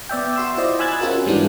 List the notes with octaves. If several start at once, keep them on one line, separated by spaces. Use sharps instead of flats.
B3 D5 E5 G5
F#4 C6 E6
E4 F4 C5 D5 D#5
G#5 B5 E6 F#6 G#6 A6
C4 C#4 F4 F#4 G#4 A#4
G#2 E3 G3 B3 D4 E4